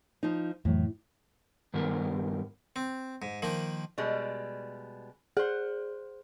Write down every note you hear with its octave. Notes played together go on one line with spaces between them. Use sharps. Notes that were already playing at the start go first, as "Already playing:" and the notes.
F3 D#4
F2 A2 E3 F#3
G2 D#3 B3 A#4
C4
G#2
D#3 F3 A#3
B2 G3 G#3
G#4 C5 F#5